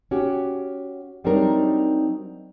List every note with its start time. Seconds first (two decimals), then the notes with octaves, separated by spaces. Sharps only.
0.11 C#4 F#4 G4
1.24 F#3 G3 C4 D4 D#4 A#4